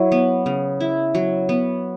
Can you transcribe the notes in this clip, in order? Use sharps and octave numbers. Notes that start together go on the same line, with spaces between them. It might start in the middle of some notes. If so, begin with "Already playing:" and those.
Already playing: F#3 E4
B3
C#3
E4
F#3
B3